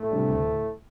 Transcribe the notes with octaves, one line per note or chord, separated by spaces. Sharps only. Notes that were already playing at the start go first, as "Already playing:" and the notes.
Already playing: A2 A3
C3 G3 D4
D2